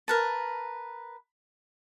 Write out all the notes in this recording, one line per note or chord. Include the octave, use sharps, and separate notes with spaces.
A#4 B4 A5